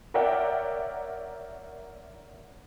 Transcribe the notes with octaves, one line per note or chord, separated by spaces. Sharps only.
A#4 C#5 D5 E5 F#5 G5